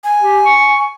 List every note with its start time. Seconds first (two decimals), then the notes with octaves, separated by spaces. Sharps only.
0.04 G#5
0.21 G4
0.46 C#6